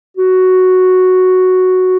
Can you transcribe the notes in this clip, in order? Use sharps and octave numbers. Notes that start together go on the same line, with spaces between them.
F#4